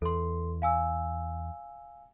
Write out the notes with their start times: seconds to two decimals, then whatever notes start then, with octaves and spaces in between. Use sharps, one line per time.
0.02 E2 A4 C6
0.62 F5 G#5 E6